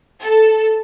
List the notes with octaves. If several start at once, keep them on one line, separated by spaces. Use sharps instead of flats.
A4